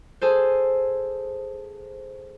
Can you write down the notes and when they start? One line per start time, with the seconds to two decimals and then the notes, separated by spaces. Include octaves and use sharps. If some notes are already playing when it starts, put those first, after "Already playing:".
0.21 G#4 A4 C5